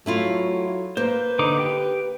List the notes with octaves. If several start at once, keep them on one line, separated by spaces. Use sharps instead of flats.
F#3 A3 E4 F4
A#3 B4 C5
D3 D#4 D6
G4 G5